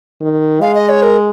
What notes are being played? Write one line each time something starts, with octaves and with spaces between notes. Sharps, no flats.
D#3
G#3 F5
D#5
C#5
A#4